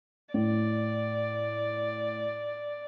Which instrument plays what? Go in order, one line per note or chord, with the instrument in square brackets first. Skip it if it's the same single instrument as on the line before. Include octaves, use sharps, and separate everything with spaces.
[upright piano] A2 [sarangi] D5